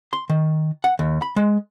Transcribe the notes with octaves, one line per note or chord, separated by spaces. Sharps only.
C6
D#3
F#5
D#2
B5
G#3